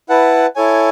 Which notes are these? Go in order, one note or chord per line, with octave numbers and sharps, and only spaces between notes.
E4 B4 F#5 A5
E4 A4 C#5 G#5